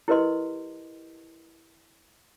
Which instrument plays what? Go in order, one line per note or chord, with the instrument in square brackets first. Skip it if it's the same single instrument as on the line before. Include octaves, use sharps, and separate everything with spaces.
[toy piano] E4 G4 A#4 B4 D#5 C6